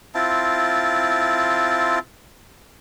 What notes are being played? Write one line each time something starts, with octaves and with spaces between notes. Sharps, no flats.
C4 E4 F4 A5